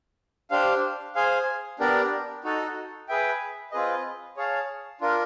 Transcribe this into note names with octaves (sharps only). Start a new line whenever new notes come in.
D4 G4 C5 F5
G#4 C5 F5 G#5
B3 D4 G4 A#4 D5
D#4 F#4 A4
G#4 B4 E5 G5
C4 F4 G#4 B4 D#5
G#4 C#5 F5 A5
D4 F4 A#4